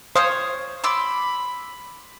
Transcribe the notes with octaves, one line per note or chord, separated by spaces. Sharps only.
C5 C#5 F5 C#6 D#6
B5 C6 D6 E6